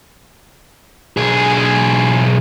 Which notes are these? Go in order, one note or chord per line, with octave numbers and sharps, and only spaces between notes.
B1 G#4